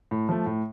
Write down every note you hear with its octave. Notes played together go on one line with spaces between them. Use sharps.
A2
F3 A3
A2